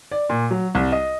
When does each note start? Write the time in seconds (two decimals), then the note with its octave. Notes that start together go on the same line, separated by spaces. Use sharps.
0.12 D5
0.30 A#2
0.51 F#3
0.75 C2
0.92 D#5